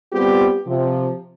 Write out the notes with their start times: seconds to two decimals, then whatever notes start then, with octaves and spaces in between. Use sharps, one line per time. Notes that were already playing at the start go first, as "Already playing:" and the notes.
0.13 G3 B3 C4 F4 G4
0.67 C3 F3